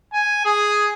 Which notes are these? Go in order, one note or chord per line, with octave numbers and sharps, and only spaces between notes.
G#5
G#4